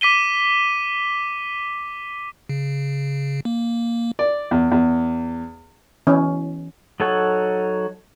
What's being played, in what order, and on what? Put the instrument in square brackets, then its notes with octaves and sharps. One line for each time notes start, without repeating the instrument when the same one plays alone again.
[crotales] D6 B6 D#7 G7
[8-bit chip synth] C#3
A#3
[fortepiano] D5
E2
E2
[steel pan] E3 C#4
[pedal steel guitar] F#3 D#4 A4 C#5 F#5